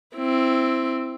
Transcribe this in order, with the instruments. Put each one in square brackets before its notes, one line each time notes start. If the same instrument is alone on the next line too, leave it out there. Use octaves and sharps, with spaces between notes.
[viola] C4 E4